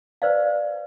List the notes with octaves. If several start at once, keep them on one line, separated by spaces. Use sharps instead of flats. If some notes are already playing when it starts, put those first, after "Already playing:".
B4 C5 D5 F5